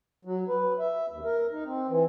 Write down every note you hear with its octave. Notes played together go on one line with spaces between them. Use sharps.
F#3
B4
E5
D#2
A#4
D#4
C4
E3